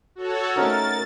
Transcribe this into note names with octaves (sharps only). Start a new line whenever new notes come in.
F#4 A4 C#5
A3 C#4 D#4 A#4 A6